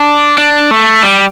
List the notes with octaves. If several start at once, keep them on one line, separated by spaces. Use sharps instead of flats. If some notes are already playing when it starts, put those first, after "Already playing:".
Already playing: D4
D4
A3
G3